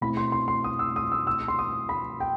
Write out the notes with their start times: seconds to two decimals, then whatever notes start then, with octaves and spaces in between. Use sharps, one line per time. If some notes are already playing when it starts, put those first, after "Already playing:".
0.01 B2 A3 C4 E4 B5
0.17 C6
0.32 C6
0.48 C6
0.64 D#6
0.79 E6
0.96 D#6
1.12 E6
1.27 E6
1.48 C6
1.59 D#6
1.89 B5
2.20 G5